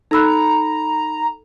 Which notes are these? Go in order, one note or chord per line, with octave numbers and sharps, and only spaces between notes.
D#4 A4 A#5 B5 E6 F#6